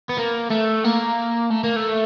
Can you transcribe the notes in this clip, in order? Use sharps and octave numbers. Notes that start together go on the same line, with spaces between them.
B3
A#3
A3
A#3
A3
A#3
A3